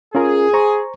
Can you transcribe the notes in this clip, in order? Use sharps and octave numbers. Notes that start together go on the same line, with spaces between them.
C#4 F4 G#4 A#4
C5 A#5 C#6